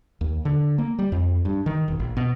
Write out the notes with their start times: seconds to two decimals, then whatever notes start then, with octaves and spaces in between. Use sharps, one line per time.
0.21 D#2
0.45 D3
0.78 A#3
0.99 G3
1.12 F2
1.45 G2
1.66 D#3
1.88 E1
1.99 A#1
2.17 B2